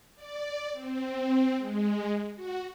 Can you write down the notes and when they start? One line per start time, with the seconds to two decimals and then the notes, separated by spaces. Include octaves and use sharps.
0.15 D5
0.73 C4
1.58 G#3
2.35 F#4